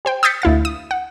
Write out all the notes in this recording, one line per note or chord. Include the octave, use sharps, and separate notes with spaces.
G4 C5 G5
D#6 E6 G6 A6 B6 C#7
D2 E4 F5 A6
D#6
F#5